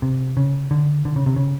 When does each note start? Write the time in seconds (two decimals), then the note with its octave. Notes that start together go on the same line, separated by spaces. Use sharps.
0.02 C3
0.37 C#3
0.71 D3
1.05 D3
1.16 C#3
1.26 C3
1.36 C#3